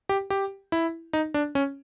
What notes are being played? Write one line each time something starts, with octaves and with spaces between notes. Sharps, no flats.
G4
G4
E4
D#4
D4
C#4